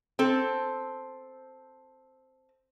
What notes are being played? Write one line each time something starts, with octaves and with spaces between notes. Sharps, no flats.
C4 A4